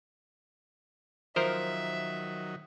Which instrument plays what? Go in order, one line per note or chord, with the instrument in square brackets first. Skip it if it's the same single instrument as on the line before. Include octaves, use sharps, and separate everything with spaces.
[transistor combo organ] D#3 F#3 [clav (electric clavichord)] F3 A#4 [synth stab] C5 [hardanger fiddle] E5